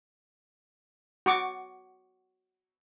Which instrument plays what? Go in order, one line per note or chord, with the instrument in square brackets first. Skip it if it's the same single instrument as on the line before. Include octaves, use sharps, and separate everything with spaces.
[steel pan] F#4 C#6 D6